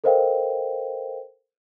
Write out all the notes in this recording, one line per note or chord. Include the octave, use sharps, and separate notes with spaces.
A4 A#4 C5 D#5 F5 G5